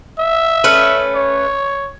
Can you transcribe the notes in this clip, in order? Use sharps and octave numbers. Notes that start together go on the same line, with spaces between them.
E5
A3 C#4 B4
C#5